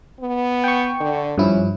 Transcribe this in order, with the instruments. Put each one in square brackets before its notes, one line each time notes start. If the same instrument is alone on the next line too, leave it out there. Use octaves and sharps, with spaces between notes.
[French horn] B3
[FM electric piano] G5 C#6
[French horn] D3
[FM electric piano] G2 F3 E4 [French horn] C#4